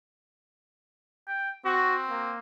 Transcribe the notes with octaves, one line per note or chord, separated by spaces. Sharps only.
G5
C4 F#4
A#3